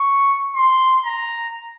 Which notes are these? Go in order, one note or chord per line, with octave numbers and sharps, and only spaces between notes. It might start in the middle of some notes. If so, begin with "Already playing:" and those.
Already playing: C#6
C6
A#5